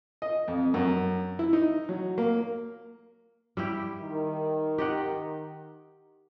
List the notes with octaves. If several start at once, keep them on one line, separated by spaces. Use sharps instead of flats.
D#5
F2
F#2
E4
D#4
F#3
A#3
G3 E4 G4
D#3
G4 D#5 F#5